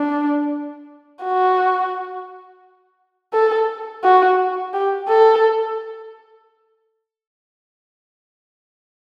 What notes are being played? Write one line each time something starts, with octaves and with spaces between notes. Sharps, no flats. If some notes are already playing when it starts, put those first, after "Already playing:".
Already playing: D4
F#4
A4
F#4
G4
A4